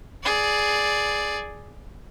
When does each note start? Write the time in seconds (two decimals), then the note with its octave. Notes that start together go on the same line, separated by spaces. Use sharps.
0.23 G#4 D5